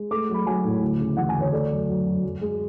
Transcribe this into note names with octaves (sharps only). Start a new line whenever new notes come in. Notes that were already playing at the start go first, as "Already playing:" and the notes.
Already playing: G#3
A3 D6
F#3
B5
F#3 G#5
A2
D2
C#3
E3 F#5
G#5
D2
C#5
A3 D5
F#2
F#3
F#2
F#2
G#3